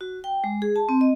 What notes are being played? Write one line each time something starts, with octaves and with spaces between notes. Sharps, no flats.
F#4
G5
G#3
G#4
A5
C4
D#5